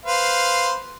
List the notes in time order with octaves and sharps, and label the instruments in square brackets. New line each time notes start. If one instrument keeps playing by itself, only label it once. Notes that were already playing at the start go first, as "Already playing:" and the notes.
[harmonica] B4 C5 F5